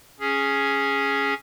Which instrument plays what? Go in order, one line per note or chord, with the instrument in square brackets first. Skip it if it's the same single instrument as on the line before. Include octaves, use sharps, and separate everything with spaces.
[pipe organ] C#4 G#4